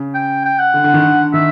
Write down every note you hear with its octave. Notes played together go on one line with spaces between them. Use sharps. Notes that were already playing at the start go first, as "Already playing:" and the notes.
Already playing: C#3
G5
G5
F#5
D3
D3
D#3
D3
D#3 E5